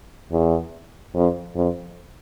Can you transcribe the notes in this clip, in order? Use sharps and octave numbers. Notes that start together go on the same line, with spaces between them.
E2
F2
F2